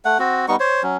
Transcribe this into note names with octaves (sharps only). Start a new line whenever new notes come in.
A3 F#5
C4 F#4
G3 B3 D#4 C#6
C5 C#5
F#3 C#4